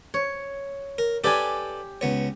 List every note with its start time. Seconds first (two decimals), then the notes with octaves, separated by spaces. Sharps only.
0.14 C#5
0.98 A#4
1.24 G4 A4 B4 D5 G#5
2.01 C#2 B3 C#5